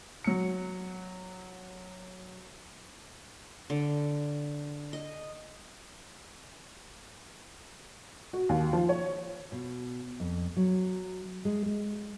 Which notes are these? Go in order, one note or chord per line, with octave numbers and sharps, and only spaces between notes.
F#3 C#7
D3
D#5
F#4
D#2
F3
C#5
B2
F2
F#3
G#3
G#3